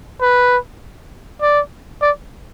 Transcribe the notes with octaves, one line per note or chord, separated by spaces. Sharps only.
B4
D5
D5